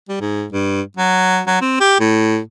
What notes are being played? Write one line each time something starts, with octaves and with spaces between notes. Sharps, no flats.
G3
G#2
G2
F#3
F#3
C4
G4
A2